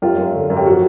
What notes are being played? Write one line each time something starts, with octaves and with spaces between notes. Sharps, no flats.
F#2 F4 G4
F#2
D3
F#2
G4
F3 F#4